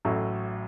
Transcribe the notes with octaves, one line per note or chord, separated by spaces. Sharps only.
A1 A2 F#3